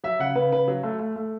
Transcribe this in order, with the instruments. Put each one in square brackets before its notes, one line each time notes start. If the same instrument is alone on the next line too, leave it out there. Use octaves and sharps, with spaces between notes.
[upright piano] F#3 E5
C#3 F#5
C#3 B4
C#3 B4
F#3
A3
A3
A3